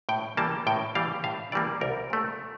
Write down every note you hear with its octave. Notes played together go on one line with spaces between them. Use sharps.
A2 G5
E3 G3 A#3 A5
A2 G5
E3 G3 A#3 F5
A2 F5
E3 G3 A#3 D5
C2 A#4
A#2 A3